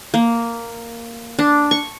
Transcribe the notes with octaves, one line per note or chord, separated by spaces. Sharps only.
A#3
D4
C#6